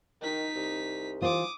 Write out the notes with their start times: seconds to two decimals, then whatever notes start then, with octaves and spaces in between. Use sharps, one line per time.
0.21 D#3 D#4 B6
0.55 C2
1.21 E3 F4 C5 D6 D#6